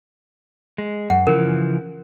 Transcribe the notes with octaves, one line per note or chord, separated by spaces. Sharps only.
G#3
F#2 F#5
C#3 E3 F3 A#4